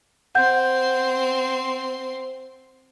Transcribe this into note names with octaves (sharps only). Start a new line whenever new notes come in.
C4 F#5 C6 G6